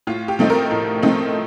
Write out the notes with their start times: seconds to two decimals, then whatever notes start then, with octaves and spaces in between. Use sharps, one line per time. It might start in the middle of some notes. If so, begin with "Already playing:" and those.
0.07 A2 F4
0.28 G4
0.39 F3 A3 C4 D#4
0.50 A#4
0.71 A2
1.02 F3 A3 C4 D#4